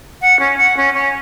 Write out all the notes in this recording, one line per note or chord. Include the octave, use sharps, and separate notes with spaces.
F#5
C#4
F#5
C#4
C#4